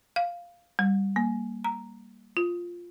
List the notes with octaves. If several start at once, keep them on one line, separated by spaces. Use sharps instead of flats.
F5
G3
A#3
A#5
F4